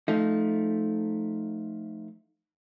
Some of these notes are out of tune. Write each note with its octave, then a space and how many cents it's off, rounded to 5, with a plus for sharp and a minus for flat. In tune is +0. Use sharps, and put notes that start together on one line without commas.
F3 +0 A3 -10 D#4 +0